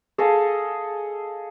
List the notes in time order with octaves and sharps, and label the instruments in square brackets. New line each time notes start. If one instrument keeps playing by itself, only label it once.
[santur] G#4 A4 D#5 F5